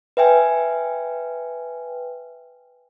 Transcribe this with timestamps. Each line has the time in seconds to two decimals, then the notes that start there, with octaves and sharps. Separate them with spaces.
0.17 B4 E5 G5 G#5